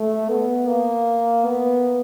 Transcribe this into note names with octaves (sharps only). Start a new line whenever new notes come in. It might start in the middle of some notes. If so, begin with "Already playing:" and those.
Already playing: A3
B3
A#3
B3